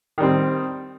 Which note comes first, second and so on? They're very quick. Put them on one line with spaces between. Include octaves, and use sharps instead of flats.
D#3 G3 C4